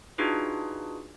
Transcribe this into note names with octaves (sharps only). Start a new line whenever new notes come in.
D4 D#4 F4 F#4 G#4 B4